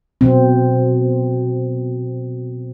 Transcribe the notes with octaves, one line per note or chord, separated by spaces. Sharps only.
B2 C4